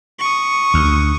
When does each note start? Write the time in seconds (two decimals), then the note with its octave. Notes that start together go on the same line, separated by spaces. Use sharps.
0.19 C#6 D#6
0.74 D2